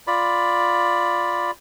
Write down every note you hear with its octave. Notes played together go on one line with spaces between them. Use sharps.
F4 D5 B5